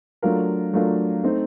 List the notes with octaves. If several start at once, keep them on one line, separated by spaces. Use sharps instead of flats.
F#3 A3 D4 F4 A#4
F#3 A3 D4 F4 A#4
A3 C4 D#4